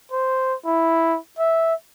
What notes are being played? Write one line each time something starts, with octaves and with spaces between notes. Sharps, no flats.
C5
E4
E5